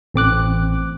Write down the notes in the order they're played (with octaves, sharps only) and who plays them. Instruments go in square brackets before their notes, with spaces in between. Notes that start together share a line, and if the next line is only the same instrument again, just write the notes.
[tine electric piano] A1 C4 D6 F#6